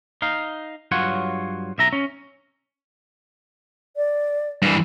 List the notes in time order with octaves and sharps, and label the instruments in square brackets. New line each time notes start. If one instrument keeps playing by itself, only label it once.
[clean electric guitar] D#4 F5
G2 F#3 F4 C#5 F#5
B1 E5 A#5
C#4
[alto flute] D5
[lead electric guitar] G2 E3